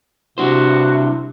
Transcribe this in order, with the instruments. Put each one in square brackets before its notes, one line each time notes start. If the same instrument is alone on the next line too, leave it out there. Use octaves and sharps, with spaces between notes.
[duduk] C3 [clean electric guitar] G3 D4 C5 [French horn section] E4 [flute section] F#4